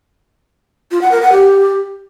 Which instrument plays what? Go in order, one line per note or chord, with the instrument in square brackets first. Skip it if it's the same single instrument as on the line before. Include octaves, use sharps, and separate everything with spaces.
[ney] F4
F#5
A#4
F#5
G4